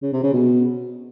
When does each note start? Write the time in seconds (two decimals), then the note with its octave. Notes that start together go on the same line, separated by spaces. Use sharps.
0.02 C#3
0.12 C3
0.23 C#3
0.33 B2